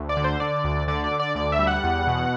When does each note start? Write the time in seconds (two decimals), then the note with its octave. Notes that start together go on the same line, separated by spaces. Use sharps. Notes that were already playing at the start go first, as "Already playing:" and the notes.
Already playing: D2
0.09 D5
0.17 D3
0.24 C5
0.40 D3 D5
0.64 D2
0.88 D3 D5
1.04 D5
1.11 D3
1.20 D5
1.35 D2 D5
1.52 E5
1.59 G3
1.67 F#5
1.84 E2
2.07 B2